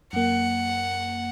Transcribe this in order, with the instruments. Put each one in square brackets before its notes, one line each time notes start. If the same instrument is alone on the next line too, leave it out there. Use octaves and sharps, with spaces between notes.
[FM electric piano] F#2 A#3 [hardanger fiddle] F#5